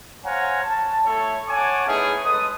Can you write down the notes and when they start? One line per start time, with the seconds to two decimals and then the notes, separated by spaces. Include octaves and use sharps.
0.25 C5 C#5 F5 F#5 G#5 A#5
0.63 A5
1.05 A3 E4 A4 C#5
1.49 C#5 F#5 G#5 A5 D6
1.87 A3 B3 C#4 D#4 E4 G#4
2.25 G#3 A4 B4 D#6